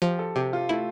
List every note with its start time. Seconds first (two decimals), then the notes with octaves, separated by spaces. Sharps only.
0.02 F3 G4
0.19 A4
0.36 C3 G4
0.53 F4
0.69 A3 E4